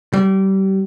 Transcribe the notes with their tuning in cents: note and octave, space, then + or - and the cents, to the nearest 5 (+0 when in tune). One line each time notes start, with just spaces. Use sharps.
G3 -30